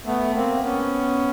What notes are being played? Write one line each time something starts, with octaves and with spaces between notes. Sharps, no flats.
A3 B3
A#3 C4
B3 C#4